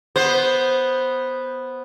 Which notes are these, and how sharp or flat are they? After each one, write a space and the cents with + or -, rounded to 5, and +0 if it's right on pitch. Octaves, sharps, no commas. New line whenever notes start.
B3 +0 C5 +0